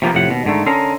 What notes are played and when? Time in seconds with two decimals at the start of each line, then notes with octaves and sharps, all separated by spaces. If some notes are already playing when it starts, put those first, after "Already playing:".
0.02 C3 F3 A#3 B3
0.14 F2 A2 C3 F#5
0.30 D#2 B2
0.45 G#2 D3 D#3 A3
0.66 D3 C#4 A4 A#4 D#5 C6